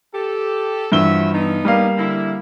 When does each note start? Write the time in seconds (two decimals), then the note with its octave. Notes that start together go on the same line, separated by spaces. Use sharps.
0.13 G4 A4
0.92 G2 E3 F3 F#4 E5 G7
1.33 B3 D4 D#4
1.65 G3 A#3 F5
1.97 D3 E4